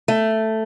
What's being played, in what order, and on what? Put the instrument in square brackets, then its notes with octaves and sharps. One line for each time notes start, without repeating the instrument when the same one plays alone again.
[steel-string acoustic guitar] A3